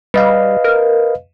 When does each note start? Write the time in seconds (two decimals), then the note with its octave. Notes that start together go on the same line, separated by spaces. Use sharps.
0.14 G3 B4 D#5 F5
0.64 A#4